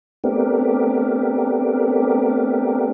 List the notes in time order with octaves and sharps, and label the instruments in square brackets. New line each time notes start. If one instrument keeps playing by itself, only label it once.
[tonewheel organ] A3 B3 C4 D4 G4 A#4